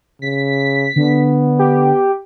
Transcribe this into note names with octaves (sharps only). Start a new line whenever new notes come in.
C#3 B6
D3 B3
G4